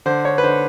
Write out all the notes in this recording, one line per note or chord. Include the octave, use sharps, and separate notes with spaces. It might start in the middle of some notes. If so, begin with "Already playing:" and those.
D3 C5
C#5
B4
D3 C5